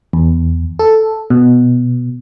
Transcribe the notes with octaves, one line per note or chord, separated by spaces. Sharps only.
E2
A4
B2